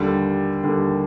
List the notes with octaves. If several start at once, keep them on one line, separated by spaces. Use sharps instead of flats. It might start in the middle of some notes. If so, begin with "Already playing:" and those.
Already playing: D#2 D3 G3
D#2 D3 G3